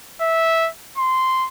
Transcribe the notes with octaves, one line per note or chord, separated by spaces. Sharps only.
E5
C6